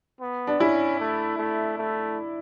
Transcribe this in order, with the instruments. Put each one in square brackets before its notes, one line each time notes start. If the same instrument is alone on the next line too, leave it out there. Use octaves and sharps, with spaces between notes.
[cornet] B3
[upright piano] D4
[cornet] C#4 [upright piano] E4
[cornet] A3
A3
A3